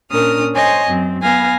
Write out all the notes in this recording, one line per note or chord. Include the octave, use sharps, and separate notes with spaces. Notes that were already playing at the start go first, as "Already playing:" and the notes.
A#2 C#4 D4 A#4 D#6 F6
C5 C#5 D#5 G#5
F#2 C4
B3 B4 F5 G#5 A#6